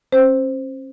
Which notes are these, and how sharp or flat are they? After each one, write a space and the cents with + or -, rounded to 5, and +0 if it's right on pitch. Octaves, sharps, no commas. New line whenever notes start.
C#4 -45 C5 +0